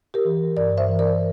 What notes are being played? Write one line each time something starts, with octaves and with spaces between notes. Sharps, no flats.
G4 A#4
E3
G2 A#4 D5
C5 E5
E3
A#4 D5